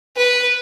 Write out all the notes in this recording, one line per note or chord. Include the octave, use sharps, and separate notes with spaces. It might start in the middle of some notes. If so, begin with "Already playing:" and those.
B4